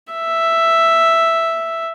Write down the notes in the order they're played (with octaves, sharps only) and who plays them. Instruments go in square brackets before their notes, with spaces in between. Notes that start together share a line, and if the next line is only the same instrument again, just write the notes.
[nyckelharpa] E5